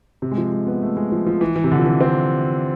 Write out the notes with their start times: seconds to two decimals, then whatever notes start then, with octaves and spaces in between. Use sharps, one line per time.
0.22 C3
0.31 G#3
0.38 F3
0.52 G#3
0.67 B3
0.82 A3
0.97 G#3
1.12 F3
1.26 F3
1.41 E3
1.56 E3
1.64 C3
1.71 D3
1.79 F3
1.86 E3
2.01 C4